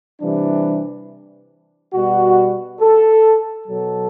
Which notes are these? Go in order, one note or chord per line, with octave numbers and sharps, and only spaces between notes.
C3 E3 G3 D4
B2 G3 F#4
A4
B2 F#3 A4